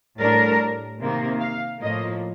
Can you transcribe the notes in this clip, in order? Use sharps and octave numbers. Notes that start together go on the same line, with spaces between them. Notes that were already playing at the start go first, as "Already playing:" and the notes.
A2 G3 D4 A#4
C3 D#3 A#3
F5
A2 F3 A#3 D#5